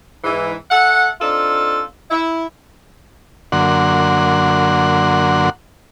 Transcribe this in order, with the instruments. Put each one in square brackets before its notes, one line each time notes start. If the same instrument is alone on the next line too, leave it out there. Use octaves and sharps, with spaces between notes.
[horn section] G#2 E3
A4 E5 F#5
C4 D4 D#4 F4 A4
E4
[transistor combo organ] F#2 D3 A#3 F#5 C6